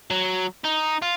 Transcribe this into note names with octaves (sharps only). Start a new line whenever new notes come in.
F#3
D#4
F4